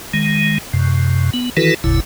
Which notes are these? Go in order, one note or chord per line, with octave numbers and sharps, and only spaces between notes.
D#3 G#3
F#2 C3
B3
D#3 E3 E4 F#4 A4 B4
F#1 D2 A2 C#3 E4